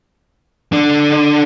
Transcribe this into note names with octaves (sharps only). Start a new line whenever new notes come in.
D3 D4